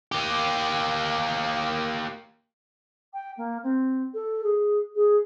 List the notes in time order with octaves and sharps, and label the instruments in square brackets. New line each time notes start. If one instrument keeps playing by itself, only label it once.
[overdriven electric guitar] A#3 G4
[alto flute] G5
A#3
C4
A4
G#4
G#4